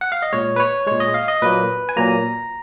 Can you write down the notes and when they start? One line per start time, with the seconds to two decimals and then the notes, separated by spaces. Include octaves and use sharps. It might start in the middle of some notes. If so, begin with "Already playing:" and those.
0.01 F#5
0.12 F5
0.22 D#5
0.33 A#2 G#3 C#5
0.56 B4
0.60 C#5
0.87 A#2 G#3 C#5
1.00 D#5
1.14 F5
1.28 D#5
1.42 A#2 F#3 A#3 B4
1.89 G#5
1.96 A#2 F#3 A#3 A#5